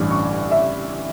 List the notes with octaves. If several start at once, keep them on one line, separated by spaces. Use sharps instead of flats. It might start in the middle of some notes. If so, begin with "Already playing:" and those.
Already playing: A1 G2 E3
C#6
E5